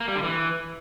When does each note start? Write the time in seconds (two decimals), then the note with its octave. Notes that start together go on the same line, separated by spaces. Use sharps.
0.01 A#3
0.08 G3
0.15 D3
0.23 E3